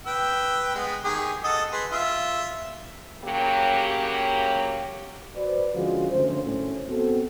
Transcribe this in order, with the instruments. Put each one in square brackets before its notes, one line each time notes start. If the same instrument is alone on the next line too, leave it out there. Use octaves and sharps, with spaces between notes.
[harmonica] B4 G5 E6
G#3 B3
D#3 G4 G#4
A4 D#5 F#5
G#4 B4 C6
F4 E5
[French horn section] C#3 F#3 A#3 G4
[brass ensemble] F#4 B4 C5 D5
D3 F3 G#3 C#4 F4 F#4
F#1 D3 A3 C#4 C5
G#1 C#2 A2 C#4
B3 C4 F#4 A4